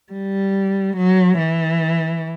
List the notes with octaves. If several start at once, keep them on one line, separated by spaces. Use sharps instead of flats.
G3
F#3
E3